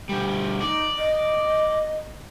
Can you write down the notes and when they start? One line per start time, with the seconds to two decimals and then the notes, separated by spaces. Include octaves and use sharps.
0.09 D2 G3
0.61 D#4 D5
0.98 D#5